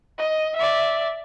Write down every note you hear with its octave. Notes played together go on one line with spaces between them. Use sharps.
D#5
D5 E5